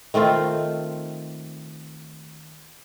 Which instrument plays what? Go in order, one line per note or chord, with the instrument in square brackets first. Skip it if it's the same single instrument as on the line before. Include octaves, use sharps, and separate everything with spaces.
[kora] D#3 A3 C4 F4